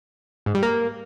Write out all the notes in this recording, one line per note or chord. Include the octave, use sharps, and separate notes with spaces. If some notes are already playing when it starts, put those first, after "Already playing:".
G#2
G3
A#3